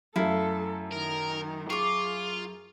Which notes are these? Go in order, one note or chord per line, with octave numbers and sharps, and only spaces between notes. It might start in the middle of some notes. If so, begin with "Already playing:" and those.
F#2 A3 E4 A4 F5
D#3 A#4
F4 G#4 C#6 D6